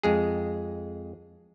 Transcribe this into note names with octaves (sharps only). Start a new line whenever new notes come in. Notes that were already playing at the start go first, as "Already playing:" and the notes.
F2 G#3 G#4